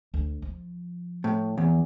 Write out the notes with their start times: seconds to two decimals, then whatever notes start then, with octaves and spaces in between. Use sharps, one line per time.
0.14 D2
0.42 F3
1.24 A2
1.58 E2